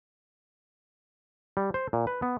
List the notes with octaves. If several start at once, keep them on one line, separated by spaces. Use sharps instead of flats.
G3
C5
A#2
B4
B3